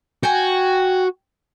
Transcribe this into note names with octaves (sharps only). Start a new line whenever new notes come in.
F#4 G5 G#5